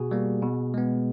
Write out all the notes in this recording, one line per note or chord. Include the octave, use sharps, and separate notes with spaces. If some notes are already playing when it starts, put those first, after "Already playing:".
Already playing: B2 F#4 G#4
G3 A#3
B2
G#3 B3